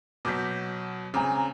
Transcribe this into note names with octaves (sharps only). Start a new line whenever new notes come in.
B2 F#3 D6 G6 B6
C#3 C4 G#5 A#5 D6